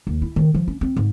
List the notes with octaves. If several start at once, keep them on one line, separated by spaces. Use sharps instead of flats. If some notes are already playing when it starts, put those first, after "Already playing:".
D#2
E4
D#3
F3
C#4
C4
G#2